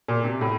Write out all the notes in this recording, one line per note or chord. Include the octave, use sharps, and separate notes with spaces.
A#2
C3
A2